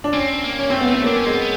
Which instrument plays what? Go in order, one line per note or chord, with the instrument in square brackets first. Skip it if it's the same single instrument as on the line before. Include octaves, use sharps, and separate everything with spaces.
[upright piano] D4
[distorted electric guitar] C4 [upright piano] C#4
[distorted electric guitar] A#3
[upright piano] C#4
[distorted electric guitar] A3 [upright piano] C4
[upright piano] B3
C4
A#3
[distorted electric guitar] D4
C#4
[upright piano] G#3 [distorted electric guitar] C4
[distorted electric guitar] B3